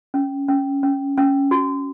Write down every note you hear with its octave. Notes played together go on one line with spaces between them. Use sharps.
C#4
C#4
C#4
C#4
F#4